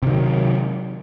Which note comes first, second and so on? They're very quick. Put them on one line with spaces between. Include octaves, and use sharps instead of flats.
C3 D#3 F#3